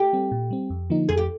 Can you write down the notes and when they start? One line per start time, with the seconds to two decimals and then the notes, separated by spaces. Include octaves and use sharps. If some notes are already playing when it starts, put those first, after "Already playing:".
Already playing: G4
0.13 G3 C4
0.32 A#2
0.51 G3 C4
0.70 F2
0.90 D3 F3 A#3 D#4
1.09 F2 G#4
1.18 G4